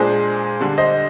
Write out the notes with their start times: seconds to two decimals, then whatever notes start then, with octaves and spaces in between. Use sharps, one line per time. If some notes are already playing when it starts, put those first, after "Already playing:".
Already playing: A#2 G#3 D4 G#4 C5
0.60 D3 G3 D4
0.78 C5 D#5